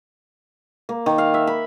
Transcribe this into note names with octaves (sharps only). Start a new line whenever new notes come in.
A#3
D#3
F5
E5
B5